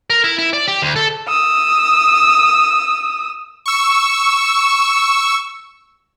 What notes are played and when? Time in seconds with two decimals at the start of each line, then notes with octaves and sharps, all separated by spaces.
0.10 A#4
0.24 E4
0.39 E4
0.53 D5
0.68 G4
0.82 D2
0.96 A4
1.28 D#6 E6
3.66 C#6 E6